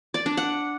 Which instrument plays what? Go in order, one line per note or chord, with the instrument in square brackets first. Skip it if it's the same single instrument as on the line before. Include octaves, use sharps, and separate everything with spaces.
[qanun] D5
D4
F#5